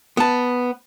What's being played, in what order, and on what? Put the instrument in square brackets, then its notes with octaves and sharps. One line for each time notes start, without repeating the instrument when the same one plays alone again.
[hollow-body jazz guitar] B3 A5